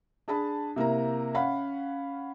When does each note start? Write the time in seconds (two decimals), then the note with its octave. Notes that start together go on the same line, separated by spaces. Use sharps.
0.28 D4 G#4 A5 B5
0.76 C3 A#3 E4 A#5
1.34 C#4 F5 F#5 B5